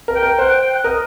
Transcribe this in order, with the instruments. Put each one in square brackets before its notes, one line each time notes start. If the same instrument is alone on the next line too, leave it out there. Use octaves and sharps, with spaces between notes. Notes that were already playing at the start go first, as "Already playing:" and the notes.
[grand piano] A#4
[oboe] G5
[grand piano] A#4
[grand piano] C5 [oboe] F#5
[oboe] G5
G5
F#5
[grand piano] A#4 [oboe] D#5